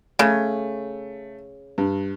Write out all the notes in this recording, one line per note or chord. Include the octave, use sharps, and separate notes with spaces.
C#3 A3
G2